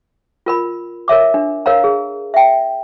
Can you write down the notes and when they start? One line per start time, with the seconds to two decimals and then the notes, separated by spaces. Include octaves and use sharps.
0.46 F4 A#4 B5
1.08 A#4 C#5 E5 D6
1.34 D4
1.66 A#4 C#5 F5 A#5
1.84 G#4
2.34 E5 G5